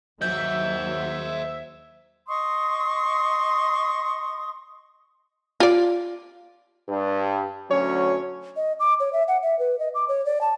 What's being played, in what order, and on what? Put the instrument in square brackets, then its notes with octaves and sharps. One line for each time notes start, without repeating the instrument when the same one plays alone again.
[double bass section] D#2 D#3 F#3 [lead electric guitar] C5 D#5 [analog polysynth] E5 [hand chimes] G6
[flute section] D#5 C6 C#6 D#6
[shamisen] F4 D5
[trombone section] G2
[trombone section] D2 F#3 C#4 [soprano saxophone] C#5
[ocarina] D#5
D6
C#5
E5
F#5
E5
B4
D#5
D6
C#5
D5
A5